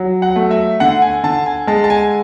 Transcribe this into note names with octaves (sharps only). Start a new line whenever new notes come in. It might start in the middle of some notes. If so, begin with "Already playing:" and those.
Already playing: F#3
F#5
A3
E5
D3 F#5
G#5
D3 A5
G#5
G#3 A5
A5
G#5